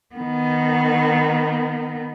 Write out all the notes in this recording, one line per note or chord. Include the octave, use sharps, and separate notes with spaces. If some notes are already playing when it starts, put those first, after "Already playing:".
D#3 B3